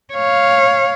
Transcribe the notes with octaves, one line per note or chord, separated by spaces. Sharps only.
C#5 F5